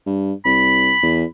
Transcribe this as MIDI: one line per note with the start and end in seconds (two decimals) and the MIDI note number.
0.06 0.33 43
0.45 0.93 36
0.45 1.24 83
1.03 1.25 40